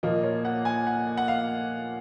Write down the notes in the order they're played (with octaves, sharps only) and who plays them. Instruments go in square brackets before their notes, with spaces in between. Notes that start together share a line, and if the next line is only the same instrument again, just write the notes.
[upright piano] A#2 F3 A#3 [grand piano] D#5
[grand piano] C#5
F#5
G#5
F#5
F#5
F5